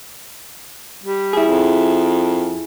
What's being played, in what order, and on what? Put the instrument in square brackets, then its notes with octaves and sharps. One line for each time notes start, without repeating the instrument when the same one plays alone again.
[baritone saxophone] G3
[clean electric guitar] E4 G#4
[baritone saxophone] F2